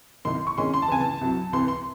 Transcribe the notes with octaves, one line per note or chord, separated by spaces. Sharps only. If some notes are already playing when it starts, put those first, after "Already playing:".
C2 C3 D#3 C6
C#6
C3 D#3 G#3 C#4 C6
C6
A5
C#2 C3 E3 G#5
A5
C2 C3 F#3
C2 C3 E3 C6
C6